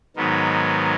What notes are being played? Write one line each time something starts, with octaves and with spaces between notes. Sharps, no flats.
G#2 D#3 F#3 B3